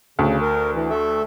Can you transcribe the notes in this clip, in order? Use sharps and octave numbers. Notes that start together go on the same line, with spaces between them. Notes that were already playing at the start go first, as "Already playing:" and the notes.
D2 C#3
A#4
E3
A3 A4 E5